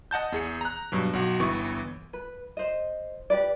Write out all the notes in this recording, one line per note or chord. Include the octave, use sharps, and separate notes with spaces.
D#5 F#5 A5 G6
E2 G#4 C#7
A#5 F#6
G2 B2 F#3
B1 F#4
G1 E3 B3 C#6
B4
C5 D#5
G4 B4 D5